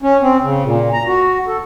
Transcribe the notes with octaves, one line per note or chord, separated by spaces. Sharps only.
C#4
C4
C#3
A#2
A#5
F#4
A4